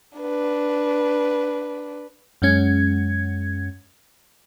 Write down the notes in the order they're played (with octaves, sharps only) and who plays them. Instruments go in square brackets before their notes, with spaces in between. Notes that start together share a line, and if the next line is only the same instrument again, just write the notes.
[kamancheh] D4 B4
[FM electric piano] F#2 G#3 C#4 G#6